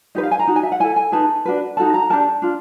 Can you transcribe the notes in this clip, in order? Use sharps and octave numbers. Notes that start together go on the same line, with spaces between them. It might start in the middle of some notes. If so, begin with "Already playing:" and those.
D#4 G4 B4 D#5
F5
G#5
A#5
D#4 F#4
G#5
E5
F#5
E4 A4 G#5
G#5
D#4 G#4 B4 A5
D4 F#4 B4
D#4 F#4 A4 A5
A#5
D4 G4 A#4 A5
D4 F4